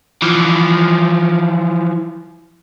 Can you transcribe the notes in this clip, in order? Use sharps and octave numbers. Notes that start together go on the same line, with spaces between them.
E3 F3